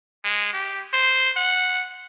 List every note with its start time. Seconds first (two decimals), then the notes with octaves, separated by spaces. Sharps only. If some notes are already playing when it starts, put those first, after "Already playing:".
0.24 G#3
0.53 G4
0.93 C5
1.36 F#5